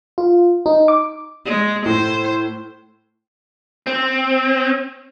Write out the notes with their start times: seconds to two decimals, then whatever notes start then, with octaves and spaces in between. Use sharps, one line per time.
0.18 F4
0.66 D#4
0.88 D6
1.45 G#3
1.86 A2 C5
3.87 C4